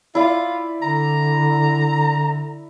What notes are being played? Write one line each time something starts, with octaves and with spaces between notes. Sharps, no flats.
E4 F4 D5
D3 A#5